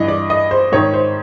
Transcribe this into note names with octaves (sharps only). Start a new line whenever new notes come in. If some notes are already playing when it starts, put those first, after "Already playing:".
Already playing: G2 E3 D#5
D5
D#5
C5
G#2 D#3 C#5
C5